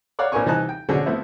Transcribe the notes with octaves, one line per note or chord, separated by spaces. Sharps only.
C#5 D5 F5 F#5
A#1 D4 A#4 B4 G#5 C#6
C2 E3 D#4 G#5 A5 F#6
G5
B2 D3 F3 C#4 F#4 G#4
F3 A3 B3 C4 E4